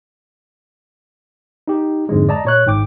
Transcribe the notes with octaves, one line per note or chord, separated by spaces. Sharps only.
D#4 G4
F2 G#2 D3 G#3
D5 D#5 A5 A#5
A#2 C#5 F#6
G#1 G#2 G5 D6